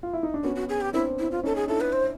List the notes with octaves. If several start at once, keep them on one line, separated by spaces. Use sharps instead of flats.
F4
E4
D#4
D4
B3 C#4 F#4
F#4
G#4
G4
C4 D4 E4
E4
F4
C#4 D#4 A4
G#4
D4 E4 A4
B4
C5